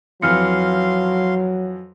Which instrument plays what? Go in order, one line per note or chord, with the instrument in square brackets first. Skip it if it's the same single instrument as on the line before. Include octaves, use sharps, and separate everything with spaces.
[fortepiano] F2 E3 [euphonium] F#3 [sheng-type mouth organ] F5 C6 [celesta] F6 C#7